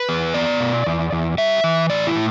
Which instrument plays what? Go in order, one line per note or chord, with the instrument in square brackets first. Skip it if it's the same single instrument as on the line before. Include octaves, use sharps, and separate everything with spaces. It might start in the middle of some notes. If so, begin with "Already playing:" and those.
Already playing: [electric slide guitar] B4
E2
B3 D5
B2
E2
E2
G3 E5
E3
A2 D5
E4
A2